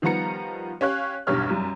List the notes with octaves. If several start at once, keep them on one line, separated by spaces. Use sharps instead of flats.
D#3 F3 G3 B3 A#5 C#7
C#4 G4 C#5 F5 F#6
B1 E2 G2 G4 C#5 F6
F#2 G3